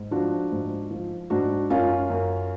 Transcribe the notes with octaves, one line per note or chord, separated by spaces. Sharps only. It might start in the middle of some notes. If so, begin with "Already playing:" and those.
Already playing: G#2
F3 D4 F#4
G#2
F3
G#2 D4 F#4
F#2 C#4 F4
F#2